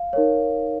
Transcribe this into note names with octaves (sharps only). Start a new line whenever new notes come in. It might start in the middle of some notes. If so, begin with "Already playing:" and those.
Already playing: F5
D#4 A#4 C#5